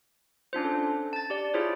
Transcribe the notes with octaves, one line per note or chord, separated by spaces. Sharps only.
C#4 D4 F4 C5
A4
A5 A6
G4 D5
E4 F4 G#4 C5 C#5